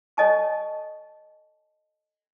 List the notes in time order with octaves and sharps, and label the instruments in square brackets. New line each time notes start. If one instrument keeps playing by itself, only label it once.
[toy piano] A4 C#5 D#5 G#5 A5 C#6